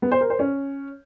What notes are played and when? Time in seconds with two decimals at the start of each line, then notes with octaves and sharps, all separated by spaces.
0.02 B3
0.12 C5
0.21 A#4
0.30 C5
0.39 C#4